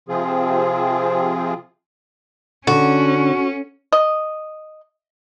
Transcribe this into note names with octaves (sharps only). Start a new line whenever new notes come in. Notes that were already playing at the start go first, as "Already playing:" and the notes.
C3 F3 C4 F4 G#4
D3 C#4 F#4
D#5